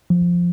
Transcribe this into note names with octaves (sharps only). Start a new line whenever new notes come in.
F3